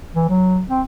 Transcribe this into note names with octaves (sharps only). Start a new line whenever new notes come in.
E3
F#3
C4